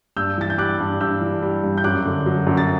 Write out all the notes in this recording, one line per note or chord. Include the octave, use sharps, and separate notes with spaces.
G2 E6 G6
E3 A6
G6
G3 D6 F#6
G2
G2 E6 G6
E3
G3
G2
G6
F#2 D6 F#6
D3
F#3
F#2
A6